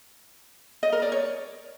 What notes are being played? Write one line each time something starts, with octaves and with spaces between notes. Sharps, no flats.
D#5
A#4
D5
C#5